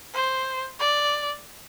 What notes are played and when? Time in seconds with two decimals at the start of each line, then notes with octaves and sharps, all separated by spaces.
0.14 C5
0.80 D5